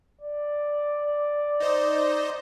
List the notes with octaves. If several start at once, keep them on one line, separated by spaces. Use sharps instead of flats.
D5
D#4 C5 D#5